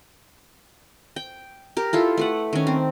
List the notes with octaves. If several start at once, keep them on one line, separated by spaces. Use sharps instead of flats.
G5
G4 A#4
E4 F4 A4
A3 B4 F#5
D#3 C#4
C4